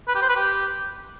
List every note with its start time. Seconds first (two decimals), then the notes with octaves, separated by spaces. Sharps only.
0.08 B4
0.15 G4
0.22 C5
0.29 B4
0.36 G4